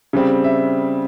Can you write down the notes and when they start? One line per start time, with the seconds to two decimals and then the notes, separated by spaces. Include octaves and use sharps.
0.13 C#3 G3 C4
0.44 E5